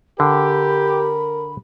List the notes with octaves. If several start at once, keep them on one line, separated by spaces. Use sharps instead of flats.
D3 G4 A#4 B5